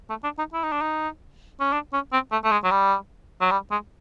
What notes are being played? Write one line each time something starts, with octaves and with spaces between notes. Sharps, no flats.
A3
D4
D#4
E4
D#4
D4
D#4
C#4
D4
C#4
C4
A3
A3
G#3
F#3
G3
F#3
G3
G#3